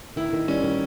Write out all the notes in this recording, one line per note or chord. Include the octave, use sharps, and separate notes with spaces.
D#3 E4
D#3
G3 C#4
D#3